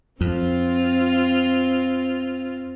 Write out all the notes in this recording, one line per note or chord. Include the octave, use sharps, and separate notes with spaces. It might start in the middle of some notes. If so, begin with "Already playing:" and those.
F2 C4 F4